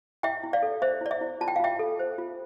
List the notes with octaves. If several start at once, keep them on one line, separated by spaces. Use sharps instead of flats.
E4 E5 G5
E4
D5 F5
A4
C5 E5
E4 D5
E5
E4
F4 A5
G5
F5
F4 E5 G5
A4
C5
F4